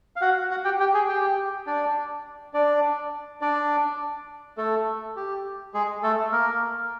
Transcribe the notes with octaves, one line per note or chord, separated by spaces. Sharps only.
F5
F#4 F#5
F#4 F#5
G4 G5
G4 G5
G#4 G#5
G4 G5
D4 D5
D4 D5
D4 D5
A3 A4
G4
G#3 G#4
A3 A4
A#3 A#4